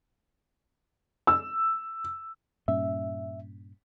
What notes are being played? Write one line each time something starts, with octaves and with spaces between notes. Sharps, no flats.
E6
G2 A#2 C#4 E5